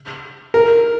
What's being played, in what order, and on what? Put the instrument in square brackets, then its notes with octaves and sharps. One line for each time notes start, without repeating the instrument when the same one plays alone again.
[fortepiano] A#4